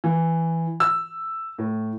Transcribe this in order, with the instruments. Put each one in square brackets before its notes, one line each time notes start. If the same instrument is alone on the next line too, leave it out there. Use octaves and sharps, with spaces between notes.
[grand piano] E3
E6
A2